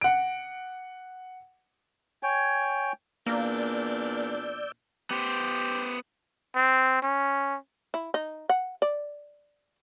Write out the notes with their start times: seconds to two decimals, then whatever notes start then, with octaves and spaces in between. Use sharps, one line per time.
0.01 F#5 D7
2.23 C#5 G5 G#5
3.26 E2 A#2 A#3 D4 D5 E6 G6
5.10 B3 G4 C5
6.56 C4
7.02 C#4
7.94 E4
8.14 D#4
8.49 F#5
8.82 D5